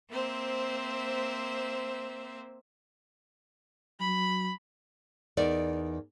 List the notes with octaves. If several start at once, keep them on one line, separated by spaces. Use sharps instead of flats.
A#3 C4 C5 E5
F#3 B5
E2 D#4 A#4 D5